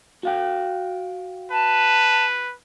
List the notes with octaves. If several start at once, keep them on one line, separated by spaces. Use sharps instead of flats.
F#4 F5 G5
B4 A5